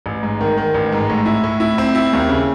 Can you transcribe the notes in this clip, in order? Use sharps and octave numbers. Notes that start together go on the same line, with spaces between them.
A1
G#2
D#3
D#3
A1
G#2
A2
E4
A2
E4
C4
E4
D#2
C#3